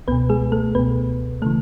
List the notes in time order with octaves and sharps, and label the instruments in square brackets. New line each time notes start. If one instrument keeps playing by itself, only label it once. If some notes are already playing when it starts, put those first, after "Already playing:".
[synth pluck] C#2 B2 B3 B4
G#3 G#4
A3 A4
C#2 B2 B3 B4
C#3 E3 A3 A4